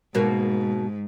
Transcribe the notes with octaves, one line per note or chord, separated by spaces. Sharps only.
G#2 B2 A#3 F#4